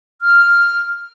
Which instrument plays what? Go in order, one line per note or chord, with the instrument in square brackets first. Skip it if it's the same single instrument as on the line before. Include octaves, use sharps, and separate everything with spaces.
[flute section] F6